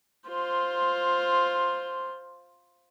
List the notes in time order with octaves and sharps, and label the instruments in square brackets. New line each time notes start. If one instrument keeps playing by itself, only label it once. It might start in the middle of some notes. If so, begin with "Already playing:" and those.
[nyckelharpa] F4 C5